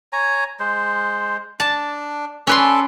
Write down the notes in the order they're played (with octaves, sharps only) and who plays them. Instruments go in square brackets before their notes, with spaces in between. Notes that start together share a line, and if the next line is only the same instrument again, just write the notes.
[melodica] C#5 G#5 A#5
G#3 C5
[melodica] D4 [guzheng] A5
[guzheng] C#4 B4 C6 [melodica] A4 D5 A5